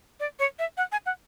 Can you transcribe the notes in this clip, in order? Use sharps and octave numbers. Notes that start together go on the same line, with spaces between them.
D5
C#5
E5
F#5
G#5
F#5